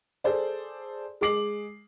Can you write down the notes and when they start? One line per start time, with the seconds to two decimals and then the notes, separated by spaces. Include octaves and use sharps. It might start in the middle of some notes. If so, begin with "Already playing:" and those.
0.24 G#4 A4 C5 D5
1.21 G#3 G#4 D6 C7 F#7